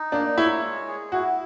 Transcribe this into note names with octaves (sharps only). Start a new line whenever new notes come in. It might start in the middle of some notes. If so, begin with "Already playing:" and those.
Already playing: D#4
A#3 D4
E4 C#5
G#3
G#4
E4 F#4